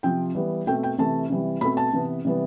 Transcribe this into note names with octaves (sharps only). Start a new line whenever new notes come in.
C3 F3 C4 G5
E3 G3 B3
B2 A3 C4 G5
G5
C3 E3 A3 A5
C3 E3 G3
B2 A3 C4 B5
A5
C3 E3 B3
C3 E3 G3 B3